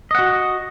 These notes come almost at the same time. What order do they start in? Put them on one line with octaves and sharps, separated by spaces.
D#5 F#5 F#4